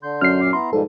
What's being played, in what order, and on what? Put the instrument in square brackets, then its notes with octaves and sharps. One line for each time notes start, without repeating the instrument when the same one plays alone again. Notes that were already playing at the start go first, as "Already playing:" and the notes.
[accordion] D3 C6 G6
[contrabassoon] F#2 [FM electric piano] F6 C7
[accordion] A#2 D6
[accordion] B3 E4 A#5 [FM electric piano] C6
[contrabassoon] G#2 [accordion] B2 F3 G3 [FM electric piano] A4